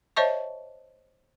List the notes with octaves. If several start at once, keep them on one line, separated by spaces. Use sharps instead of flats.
C5 C#5 D#5 E5 A5 C#6